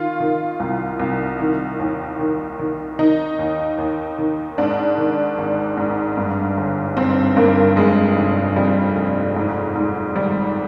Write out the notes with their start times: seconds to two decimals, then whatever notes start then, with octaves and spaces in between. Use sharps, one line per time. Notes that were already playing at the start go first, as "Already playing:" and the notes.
Already playing: D#3 F4
0.20 D#3
0.60 C2
1.00 C2
1.40 D#3
1.79 D#2
2.19 D#3
2.59 D#3
2.99 D#3 D#4
3.39 D#2
3.78 D#2
4.18 D#3
4.58 G#2 D4
4.98 D#3
5.38 G#1
5.77 G#2
6.17 G2
6.57 G1
6.97 G2 C4
7.36 G2 A#3
7.76 F2 G#3
8.16 F1
8.56 F2 G3
8.96 F1
9.36 G#2
9.75 G#2
10.16 G#1 G3